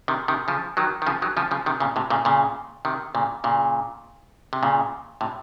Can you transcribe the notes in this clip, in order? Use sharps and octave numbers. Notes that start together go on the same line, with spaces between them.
C3 D#3
C3 D#3
C#3 F3
D#3 F#3
D#3
C#3 F3
D#3 F#3
C#3 F3
C#3 F3
C3 D#3
A#2 C#3
A2 C3
A#2 C#3
A#2 C#3
C3 D#3
A#2 C#3
A#2 C#3
C3
A#2 C#3
A2 C3